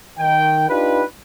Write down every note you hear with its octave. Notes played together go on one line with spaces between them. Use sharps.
D#3 G5
D4 D#4 F4 G4 B4